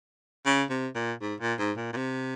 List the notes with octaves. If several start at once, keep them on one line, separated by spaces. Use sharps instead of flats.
C#3
C3
A#2
G#2
A#2
G#2
A#2
A#2
C3